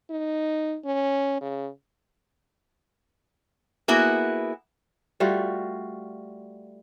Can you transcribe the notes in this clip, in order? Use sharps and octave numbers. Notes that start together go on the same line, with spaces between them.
D#4
C#4
C#3
A#3 B3 E4 F#4 G#4
G3 A3 F4 F#4